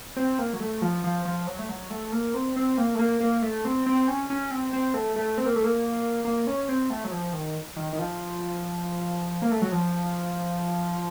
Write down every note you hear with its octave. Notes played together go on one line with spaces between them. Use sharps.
C4
A#3
F#3
A3
F3
F3
F3
F#3
A3
F#3
A3
A#3
C4
C4
A#3
A3
A#3
A#3
A3
C4
C4
C#4
C#4
C4
C4
A3
A3
C4
A#3
A3
A#3
A#3
C#4
C4
A3
F#3
F3
D#3
D#3
D#3
F3
A#3
A3
F#3
F3